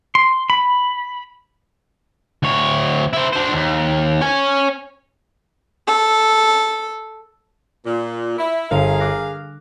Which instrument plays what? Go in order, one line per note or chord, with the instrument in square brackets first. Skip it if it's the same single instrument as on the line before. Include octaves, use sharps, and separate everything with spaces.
[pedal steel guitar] C6
B5
[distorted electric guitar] D2 C#5
E4 C5
D4 C5
D#2
C#5 G#5
[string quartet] A4
[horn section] A#2
E4
[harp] G1 [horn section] G#4 A#4 F5
[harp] D6 F#6 A#6